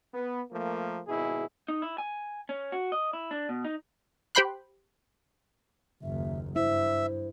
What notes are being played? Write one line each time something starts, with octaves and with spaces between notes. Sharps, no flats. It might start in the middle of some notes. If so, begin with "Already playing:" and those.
B3
F3 A3 A#3
G#1 B2 E4 G#4
D#4
E4
G#5
C#4
F#4
D#5
E4
D4
B2
D#4
G4 C5 G5 B5 C6 F#6
F#1 D#2 E5
G2 E4 C5 E5